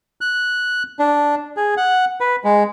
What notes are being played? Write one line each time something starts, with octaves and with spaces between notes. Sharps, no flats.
F#6
D4
G#4
F#5
B4
G#3